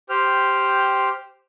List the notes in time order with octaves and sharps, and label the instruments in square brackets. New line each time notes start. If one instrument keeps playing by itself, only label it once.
[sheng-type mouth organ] G4 C5 G5 F6